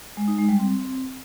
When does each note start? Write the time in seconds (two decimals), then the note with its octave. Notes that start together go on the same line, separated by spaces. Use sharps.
0.17 G#3
0.28 D#4
0.38 G#3
0.49 G3
0.59 C4